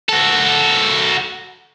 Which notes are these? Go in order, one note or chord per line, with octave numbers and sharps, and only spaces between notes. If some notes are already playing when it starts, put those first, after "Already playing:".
F#4 A4